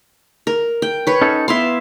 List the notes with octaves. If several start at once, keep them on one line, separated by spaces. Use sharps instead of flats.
A#4
G5
B4 C#5
C#4 D#4 A4
B3 E4 E5 F5 C6